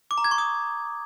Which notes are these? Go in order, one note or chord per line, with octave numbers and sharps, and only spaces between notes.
D6
A#5
G#6
C#6
D#6